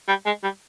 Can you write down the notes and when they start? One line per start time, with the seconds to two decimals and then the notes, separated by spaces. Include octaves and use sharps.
0.08 G3
0.26 G#3
0.43 G3